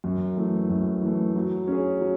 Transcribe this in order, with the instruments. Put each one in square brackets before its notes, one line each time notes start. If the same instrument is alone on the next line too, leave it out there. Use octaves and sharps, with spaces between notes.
[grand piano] F#2
E3 A3
F#2
E3 A3
F#3
C#4 G#4
F#3